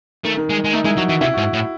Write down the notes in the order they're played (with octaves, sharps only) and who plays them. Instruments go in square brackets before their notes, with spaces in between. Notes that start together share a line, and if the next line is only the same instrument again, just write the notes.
[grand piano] D#3 [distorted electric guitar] A3
[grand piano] D#3
[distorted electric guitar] G#3
G#3
[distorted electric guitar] A3 [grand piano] D#4
[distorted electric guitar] G#3 [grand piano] E4
[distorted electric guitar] F#3 [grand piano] F#4
[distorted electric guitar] E3 [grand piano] F#4
[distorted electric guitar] C3 [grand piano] E4
[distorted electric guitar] G#2 [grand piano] F#4
[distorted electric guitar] A2